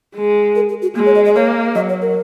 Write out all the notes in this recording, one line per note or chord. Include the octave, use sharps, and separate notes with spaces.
G#3
A#4
G#4
F#4
G#3 A#3
C#5
D#5
D#5
A#3 C#5
F#3 D#5
C#5
A#4